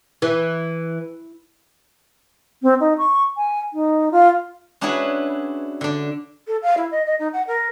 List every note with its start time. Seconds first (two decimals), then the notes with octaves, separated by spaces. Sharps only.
0.22 E3
2.63 C4
2.80 D#4
2.98 C#6
3.37 G#5
3.73 D#4
4.12 F4
4.81 C#4 D4 E4 F#4 G#4 B4
5.81 D3 D4
6.47 A4
6.62 F5
6.77 E4
6.91 D#5
7.06 D#5
7.19 D#4
7.33 F#5
7.47 A#4